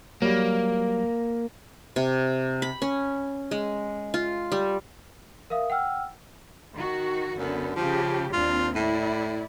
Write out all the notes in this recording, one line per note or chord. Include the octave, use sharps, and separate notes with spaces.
F#3 G3 A#3
C3
B5
C#4
G#3
F4
G3
A#4 E5 F5 D#6
F#5 G5 E6 F6
D#3 F#4
F#2 D3 B3
C#3 F3 G4
D#2 C4 D4 F4
A2 E4 D5